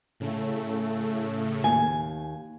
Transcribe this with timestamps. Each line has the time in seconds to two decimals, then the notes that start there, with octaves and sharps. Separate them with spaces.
0.20 A2 C#3 A3
1.64 D#2 G#5